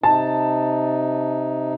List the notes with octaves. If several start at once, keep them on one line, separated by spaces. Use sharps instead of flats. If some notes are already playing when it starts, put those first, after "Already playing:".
C3 D#4 A5